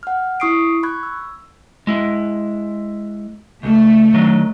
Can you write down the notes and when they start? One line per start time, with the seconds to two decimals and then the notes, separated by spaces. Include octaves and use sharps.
0.03 F#5 F6
0.40 E4 C#6 D#6 C7 D7
0.83 B5 C#6 F#6 G#6
1.03 E6
1.87 G#3 E4
3.63 C#2 A3
4.14 D3 D#3 F#3